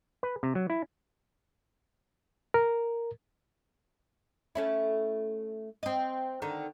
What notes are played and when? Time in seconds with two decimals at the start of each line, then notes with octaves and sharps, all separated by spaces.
0.23 B4
0.43 C3
0.55 F#3
0.70 E4
2.54 A#4
4.55 A3 C#4 E4
5.83 C4 D#5
6.42 D3 D#3